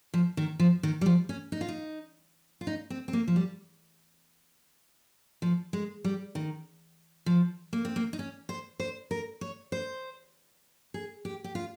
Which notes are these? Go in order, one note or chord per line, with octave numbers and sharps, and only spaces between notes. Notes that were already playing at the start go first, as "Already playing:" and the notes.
F3
D#3
F3
D#3
G3
F3
C#4
D#4
F4
D#4
F4
D#4
C4
C4
A#3
F3
G3
F3
G#3
G3
D#3
F3
A#3
C4
A#3
D#4
C#4
C5
C5
A#4
C#5
C5
G#4
G4
G4
F4